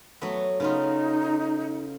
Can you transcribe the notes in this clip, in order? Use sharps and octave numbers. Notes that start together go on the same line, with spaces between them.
F#3 A3 B3
C#3 B3 D#4 F4